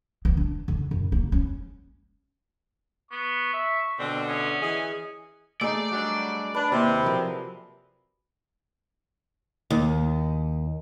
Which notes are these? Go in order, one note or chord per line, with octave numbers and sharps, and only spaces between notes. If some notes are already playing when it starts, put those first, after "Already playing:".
B3
D4
D3
F#2
A#3
C#4
B3 C#6
E5
B2 D3 C4
B3 C#4 E5 D#6
E3 G#4 D#5
A3 D#4 G#4 D5 E6
F#3 G3 D4
D4 B4
D#2 C3 E4
F3 F#3 A#4
D#2